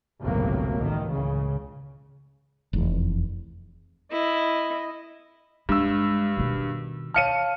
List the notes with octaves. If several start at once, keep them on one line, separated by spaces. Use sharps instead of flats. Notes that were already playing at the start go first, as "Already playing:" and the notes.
G1 C#2 A2 C3 F#3 A#3
A1 A2 D#3
C#2 C#3
F1 E2
E4 D#5
G2 G#3 E6
B2 D#3
C#5 F5 A5 F6 C#7 D#7